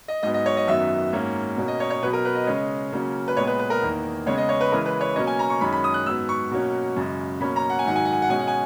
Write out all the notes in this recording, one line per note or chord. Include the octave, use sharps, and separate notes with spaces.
D#5
G#2 F#3 B3 D#5
D#5
C#5
D#5
F#2 D#3 F#3 B3 E5
G#2 F#3 A#3 C#4
B2 A#3 C#4
D#5
C#5
C#5
B2 F#3 B3 B4
A#4
B4
D#5
C#3 G#3 C#4
C#3 F#3 A#3 C#4
B4
A#2 G#3 B3 C#5
B4
B4
A#4
E2 D#3 A#3
C#3 G#3 B3 C#5
D#5
C#5
B4
C#3 E3 G#3 A#4
B4
C#5
B2 F#3 A#3 C#4 D#5
G#5
A#5
C#6
F#2 D#3 G#3 C#4 B5
B5
D#6
F#6
G#2 F#3 B3 E6
C#6
B2 F#3 A#3 C#4
F#2 C#3 G#3
B2 F#3 A#3 C#4 B5
A#5
F#5
G#5
G#2 D#3 F#3 F#5
G#5
F#5
G#5
F#5
B2 G#3 C#4 G#5
F#5
G#5